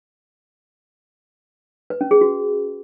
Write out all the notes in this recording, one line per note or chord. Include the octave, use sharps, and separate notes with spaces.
B4
C#4
G#4
F#4